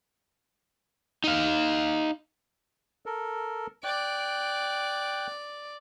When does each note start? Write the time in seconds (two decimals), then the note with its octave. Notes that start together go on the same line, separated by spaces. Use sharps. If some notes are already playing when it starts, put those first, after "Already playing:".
1.24 D#4 F5
3.06 A4 A#4
3.84 D5 G5 F#6